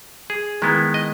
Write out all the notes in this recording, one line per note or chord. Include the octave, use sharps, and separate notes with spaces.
G#4
D#3 G#3 B3 E4
D#5